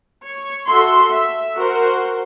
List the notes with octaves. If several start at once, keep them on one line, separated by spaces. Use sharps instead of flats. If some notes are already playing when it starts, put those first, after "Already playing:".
C#5
F#4 A4 E5 C6
E5
F#4 A#4 C5